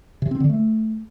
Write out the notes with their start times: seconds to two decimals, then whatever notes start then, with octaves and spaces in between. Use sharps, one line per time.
0.22 C3
0.31 C4
0.40 D3
0.49 A3